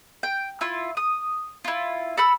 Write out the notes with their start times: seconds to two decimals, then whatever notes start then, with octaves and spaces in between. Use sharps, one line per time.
0.23 G5
0.61 E4 F4
0.97 D#6
1.65 E4 F4
2.17 A4 B5 E6